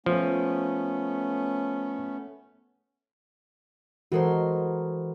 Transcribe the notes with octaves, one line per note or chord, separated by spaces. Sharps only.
F3 A3 B3 C#4
E3 G#3 F#4 A4 A#4 C5